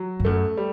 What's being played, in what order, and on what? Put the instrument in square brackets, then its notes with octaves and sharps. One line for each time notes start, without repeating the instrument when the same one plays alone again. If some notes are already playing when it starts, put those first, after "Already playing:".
Already playing: [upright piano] F#3
[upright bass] G2
[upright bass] F#2 [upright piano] A3
[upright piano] G3